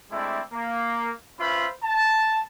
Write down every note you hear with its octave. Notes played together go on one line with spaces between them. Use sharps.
G#3 A3 C4 D4 E4 D5
A#3
C#4 F4 B4 C5 E5 B5
A5